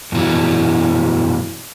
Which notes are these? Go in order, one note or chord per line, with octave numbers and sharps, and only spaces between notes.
F#2 B2 E3 F#3